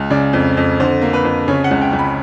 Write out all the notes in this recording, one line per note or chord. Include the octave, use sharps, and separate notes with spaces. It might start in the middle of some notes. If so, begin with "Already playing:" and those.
Already playing: C#2
C#3 D5
F2
F2
D3 C5
A#3
B4
F2
C#3 C#5
F#5
C#2
G5
C#2
B5